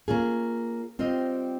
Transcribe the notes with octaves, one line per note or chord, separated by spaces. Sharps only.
A#3 C#4 F4 G#4
G3 C4 F4 C5 D#5